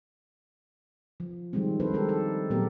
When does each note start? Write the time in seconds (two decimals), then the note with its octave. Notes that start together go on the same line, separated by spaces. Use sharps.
1.20 F3
1.53 D#3 F3 G3 G#3 C4
1.80 C4 D4 D#4 A4 B4 C5
1.93 G3 G#3 G4 A4 A#4
2.09 A4
2.50 A#2 F#3 A3 B3 G4 A#4